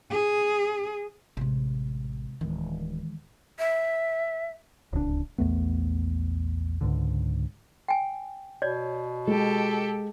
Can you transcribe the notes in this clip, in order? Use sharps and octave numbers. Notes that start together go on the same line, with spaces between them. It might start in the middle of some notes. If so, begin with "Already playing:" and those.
G#4
A1 C3 G#3
D1 D#3 E3 G#3
E5
D1 C#2 D3 D4
A#1 E2 A3 B3
C#2 G#2 D3
G5 G#5
B2 C#5 D5
G#3 G4 A4